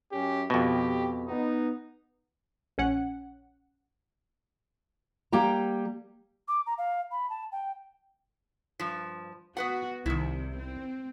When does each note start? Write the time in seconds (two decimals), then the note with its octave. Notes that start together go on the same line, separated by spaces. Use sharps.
0.12 F#2 C#4 G4
0.50 F2 B2 G4
1.27 B3 D#4
2.78 A#1 C#4 F#5
5.32 G3 A#3 G4 G5 A#5
6.48 D6
6.67 A#5
6.78 F5
7.11 B5
7.30 A5
7.52 G5
8.80 G2 F3
9.57 B3 F#4 B4 F#5
10.06 C2 C3 D#3 E4
10.60 C4